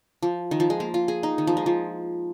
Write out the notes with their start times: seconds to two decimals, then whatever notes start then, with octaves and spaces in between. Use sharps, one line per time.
0.22 F3
0.51 D#3
0.60 F3
0.70 G#3
0.80 A#3
0.94 F4
1.08 G#4
1.23 D#4
1.38 D#3
1.47 F3
1.57 G#3
1.66 F3